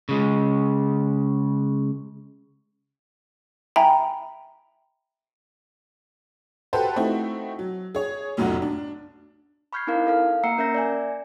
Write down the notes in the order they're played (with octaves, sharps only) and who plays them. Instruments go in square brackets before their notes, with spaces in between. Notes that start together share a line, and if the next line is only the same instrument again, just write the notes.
[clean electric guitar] C#3 G#3
[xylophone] E5 G5 G#5 A#5 B5
[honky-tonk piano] F#4 G4 A4 B4 C5
A3 C4 D#4 E4 F#4
F#3
G#4 C#5
F1 B1 F#2 A2 D#4 F#4
D4
[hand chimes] B5 C#6 F6 G6 G#6 C7
C4 D#4 E4 A#4 F5
A4 F5 F6
A#3 F#5 A#5 E6 C7 C#7
C#4 A#4 E5 G6 A#6
D5 E5 G#5